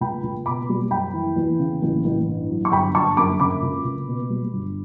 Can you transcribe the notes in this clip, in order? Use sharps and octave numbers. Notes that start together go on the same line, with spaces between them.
C#2 G5 B5
C#2
B2 B5 D6
G3
F#1 G5 B5
E3
E2
C#3
A1
A1
G2
F#3
C#6
G1 G5 B5
G1 A5 C#6
F#2 B5 D6
C#3 B5 D6
C#2
C#2
B2
G3
G1